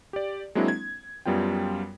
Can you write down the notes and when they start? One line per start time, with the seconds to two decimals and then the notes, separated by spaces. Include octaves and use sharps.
0.13 G4 D5
0.55 F#3 G#3 A#3 C4 D4 E4
0.68 G#6
1.26 F#2 G3 B3 F4 G5